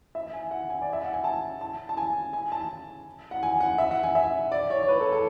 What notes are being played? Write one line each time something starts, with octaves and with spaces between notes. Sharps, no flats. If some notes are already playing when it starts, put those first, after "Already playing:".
E5
G#5
F#5
G#5
D5
E5
F#5
G#5
A5
A5
A5
G#5
G#5
A5
F#5
G#5
F#5
E5
F#5
G#5
E5
D5
C#5
C#5
B4
A4
A4